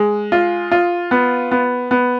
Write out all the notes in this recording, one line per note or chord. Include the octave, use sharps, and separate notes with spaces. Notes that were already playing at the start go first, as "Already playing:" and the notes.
Already playing: G#3
F4
F4
B3
B3
B3